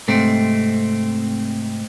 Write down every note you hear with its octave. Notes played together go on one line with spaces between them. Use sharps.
G#2 C3 A3 C4